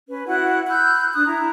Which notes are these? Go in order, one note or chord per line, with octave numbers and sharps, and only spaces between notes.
C#4 B4
E4 F#4 F#5 F#6
B5 E6 F#6 G6
D4 D#6 F#6
E4 A#5